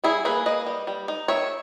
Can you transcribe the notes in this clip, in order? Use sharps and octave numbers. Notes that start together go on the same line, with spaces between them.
G3 E4 G#4
A#3 G#4 B4
A#3 B4 D#5
G3
G3
D#4
D#3 C#5 E5